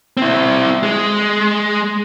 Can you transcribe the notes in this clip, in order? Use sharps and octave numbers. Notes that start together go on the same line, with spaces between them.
C4 E4
G#3